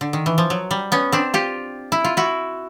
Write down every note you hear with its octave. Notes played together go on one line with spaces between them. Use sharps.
D3
D#3
E3
F3
F#3
G3
B3 C#4
C4 D4
F4 G4
E4
F4
E4 F#4